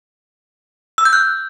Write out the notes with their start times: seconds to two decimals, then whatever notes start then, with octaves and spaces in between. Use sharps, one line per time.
0.98 E6
1.05 G6
1.13 F#6